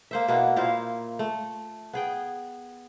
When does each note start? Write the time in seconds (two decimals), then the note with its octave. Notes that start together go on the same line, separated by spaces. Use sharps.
0.11 A#3 C5 E5
0.28 B2 A#3 B3 E4
0.56 A#2 E4 C5 F5
1.19 A3
1.93 B3 G#4 G5